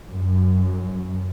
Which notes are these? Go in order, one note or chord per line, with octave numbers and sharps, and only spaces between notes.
F#2